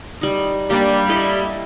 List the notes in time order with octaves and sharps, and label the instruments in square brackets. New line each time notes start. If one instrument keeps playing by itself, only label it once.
[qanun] G3 D#4
[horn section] G3 [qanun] A#3 D4
[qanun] E4 A4 D#5